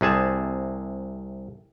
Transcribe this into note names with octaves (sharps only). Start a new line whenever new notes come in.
C2 C3 G#4 A5